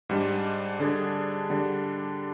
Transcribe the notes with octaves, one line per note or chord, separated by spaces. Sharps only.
G#2 G3 D4
D3 G3 D4 G#4
D3 G3 D4